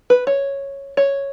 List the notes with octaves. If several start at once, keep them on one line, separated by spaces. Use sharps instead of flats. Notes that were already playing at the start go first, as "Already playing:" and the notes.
B4
C#5
C#5